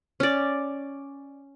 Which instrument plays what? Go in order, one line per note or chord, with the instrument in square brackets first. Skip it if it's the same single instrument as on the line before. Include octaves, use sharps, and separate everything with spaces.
[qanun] C#4 D5